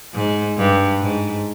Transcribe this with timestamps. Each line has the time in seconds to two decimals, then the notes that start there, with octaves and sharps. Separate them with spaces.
0.14 G#2
0.57 G2
1.01 G#2